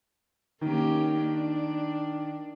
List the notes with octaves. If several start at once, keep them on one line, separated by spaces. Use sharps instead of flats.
D#3 A#3 C#4 G4
D4